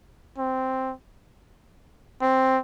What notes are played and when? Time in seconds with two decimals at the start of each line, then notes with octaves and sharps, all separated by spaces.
0.38 C4
2.22 C4